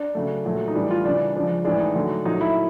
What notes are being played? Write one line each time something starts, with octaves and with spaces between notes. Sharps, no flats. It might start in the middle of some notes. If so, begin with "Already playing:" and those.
Already playing: D4
C#3 F#3 A3
A#2 F#3 A3
D#4
A2 E3 G3 D4
F4
C#3 E3 G3 D4
C#3 F3 G#3 D4
A2 E3 G#3 D4
D#4
D3 F#3 A3
A#2 F#3 A3 D#4
E4